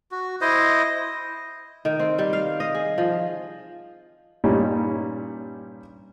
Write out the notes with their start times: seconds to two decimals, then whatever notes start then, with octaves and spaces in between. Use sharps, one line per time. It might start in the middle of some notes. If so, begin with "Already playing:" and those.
0.11 F#4
0.41 E4 C5 D#5
1.85 D#3
1.99 C4
2.18 G3
2.33 F5
2.60 D#5
2.74 G#4
2.98 F3
4.44 G2 A#2 G3 C#4 D#4